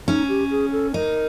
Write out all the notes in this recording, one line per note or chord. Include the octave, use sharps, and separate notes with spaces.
C#4 D#4
G4
G#4
A4
D#4 A#4